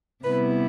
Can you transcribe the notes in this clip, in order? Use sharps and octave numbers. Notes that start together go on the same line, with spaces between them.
C3 G3 B3 E4 B4